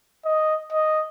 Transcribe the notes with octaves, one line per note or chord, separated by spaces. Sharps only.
D#5
D#5